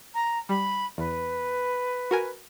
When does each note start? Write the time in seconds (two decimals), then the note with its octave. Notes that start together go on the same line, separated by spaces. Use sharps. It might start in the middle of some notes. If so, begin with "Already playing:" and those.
0.14 A#5
0.49 G3 B5
0.98 E2 B4
2.11 F#4 A#4 G#5